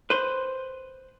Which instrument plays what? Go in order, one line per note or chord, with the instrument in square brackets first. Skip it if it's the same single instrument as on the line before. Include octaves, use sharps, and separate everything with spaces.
[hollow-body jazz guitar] B4 C5